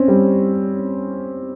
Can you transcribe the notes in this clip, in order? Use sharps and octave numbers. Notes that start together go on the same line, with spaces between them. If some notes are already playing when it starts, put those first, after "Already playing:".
Already playing: C4 C#4
G3